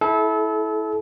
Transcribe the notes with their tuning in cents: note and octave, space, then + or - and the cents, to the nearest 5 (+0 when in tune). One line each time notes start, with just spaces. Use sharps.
E4 -15 A4 -30